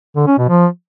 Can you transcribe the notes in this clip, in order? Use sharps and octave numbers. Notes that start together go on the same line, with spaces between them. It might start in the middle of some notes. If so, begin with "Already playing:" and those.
D3
C#4
B2
F3